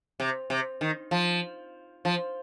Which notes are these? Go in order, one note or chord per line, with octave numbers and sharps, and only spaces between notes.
C3
C3
D#3
F3
F3